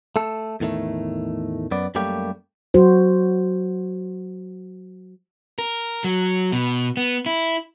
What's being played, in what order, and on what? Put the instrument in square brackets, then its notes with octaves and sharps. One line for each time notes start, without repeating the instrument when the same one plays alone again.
[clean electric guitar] A3 A4
E2 A2 D#3 A3
F#2 B3 D5
F#2 G3 A3 A#3 G4
[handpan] F#3 F#4 C5
[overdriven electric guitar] A#4
F#3
B2
B3
E4